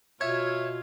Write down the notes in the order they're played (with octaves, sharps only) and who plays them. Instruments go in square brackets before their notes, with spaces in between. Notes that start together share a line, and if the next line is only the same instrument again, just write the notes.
[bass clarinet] B2 [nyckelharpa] F4 [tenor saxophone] C#5 [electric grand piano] E5 G#6